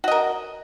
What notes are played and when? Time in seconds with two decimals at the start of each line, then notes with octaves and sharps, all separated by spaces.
0.04 F#4
0.08 D#5
0.11 A#4